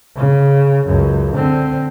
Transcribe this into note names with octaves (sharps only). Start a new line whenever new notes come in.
C#3
C#2 F#2
D3 C4